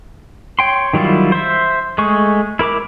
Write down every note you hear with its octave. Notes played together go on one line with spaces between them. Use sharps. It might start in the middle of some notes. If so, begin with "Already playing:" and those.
C#5 G5 C6
D#3 F#3 G3 E4 F4
C5 E5
G#3 A3 G#4 C#6
E4 A#4 B5 D6